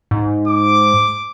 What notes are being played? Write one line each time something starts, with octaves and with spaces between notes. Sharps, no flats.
G#2
D6